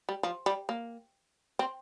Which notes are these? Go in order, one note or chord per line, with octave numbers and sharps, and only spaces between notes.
G3
F3
G3
A#3
C4